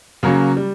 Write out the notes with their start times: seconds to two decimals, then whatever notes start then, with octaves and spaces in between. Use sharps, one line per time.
0.23 C#3 F#3 A#3 C#4
0.57 G3